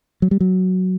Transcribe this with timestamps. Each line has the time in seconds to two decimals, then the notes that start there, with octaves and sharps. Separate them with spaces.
0.22 F#3
0.31 G3
0.40 F#3